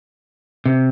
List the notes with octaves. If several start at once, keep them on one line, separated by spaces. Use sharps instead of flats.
C3